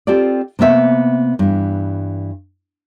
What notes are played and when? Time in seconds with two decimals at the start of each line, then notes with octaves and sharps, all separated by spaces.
0.07 C4 F4 G4 A4 D5
0.59 C3 A#3 B3 E5
1.39 G2 E3